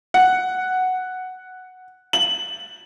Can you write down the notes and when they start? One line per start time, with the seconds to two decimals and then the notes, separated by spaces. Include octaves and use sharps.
0.14 F#5
2.13 F#7